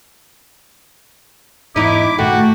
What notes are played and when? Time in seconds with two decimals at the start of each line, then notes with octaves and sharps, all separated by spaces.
1.76 E2 G#2 D#4 E4 D6
2.19 G2 A#2 D#3 A3 F#4 G5